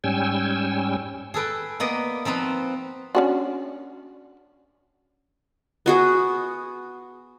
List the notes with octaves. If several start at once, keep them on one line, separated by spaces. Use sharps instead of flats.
G#2 G3 C#4 G5 G#5 E6
G#4 A4 B4 G5
A#3 B3 D5 D#5
F3 C4 D#4 B4
C#4 D4 F#4
B3 F#4 G#4